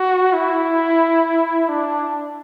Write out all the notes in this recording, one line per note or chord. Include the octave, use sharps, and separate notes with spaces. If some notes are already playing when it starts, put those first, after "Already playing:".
Already playing: F#4
E4
D4